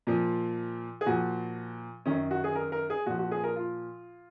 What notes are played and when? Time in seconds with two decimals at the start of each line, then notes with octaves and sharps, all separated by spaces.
0.07 A#2 F3
1.01 G#4
1.06 A#2 F3 F#4
2.06 F#2 D#3 C#4
2.31 F#4
2.44 G#4
2.55 A#4
2.72 A#4
2.90 G#4
3.06 A#2 F3 F#4
3.18 F#4
3.31 G#4
3.44 A#4
3.56 F4